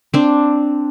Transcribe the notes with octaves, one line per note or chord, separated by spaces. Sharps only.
C4 D4